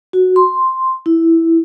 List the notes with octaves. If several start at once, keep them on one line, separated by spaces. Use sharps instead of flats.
F#4
C6
E4